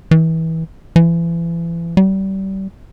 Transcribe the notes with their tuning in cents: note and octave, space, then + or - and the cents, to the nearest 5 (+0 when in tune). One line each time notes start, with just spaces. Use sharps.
E3 -25
E3 +35
G3 -30